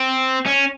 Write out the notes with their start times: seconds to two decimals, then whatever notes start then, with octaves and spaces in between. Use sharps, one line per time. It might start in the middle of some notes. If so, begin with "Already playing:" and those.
Already playing: C4
0.46 C#4